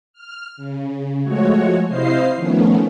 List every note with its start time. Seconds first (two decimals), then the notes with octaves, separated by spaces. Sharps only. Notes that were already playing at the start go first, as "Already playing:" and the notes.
0.13 F6
0.57 C#3
1.23 F3 G#3 A3 F#4 C#5
1.88 C3 E4 C5 D#5 F5 C7
2.36 D#3 F3 A3 B3 C#4